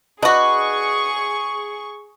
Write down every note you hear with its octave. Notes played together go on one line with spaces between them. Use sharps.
D4 F#4 G#4 B4 D#5 C#6